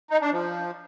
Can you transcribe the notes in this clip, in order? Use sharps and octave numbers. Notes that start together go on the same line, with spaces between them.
D#4
D4
F3